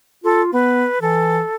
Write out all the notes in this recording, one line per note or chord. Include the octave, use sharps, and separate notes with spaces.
F4 A4
B3 B4
E3 A4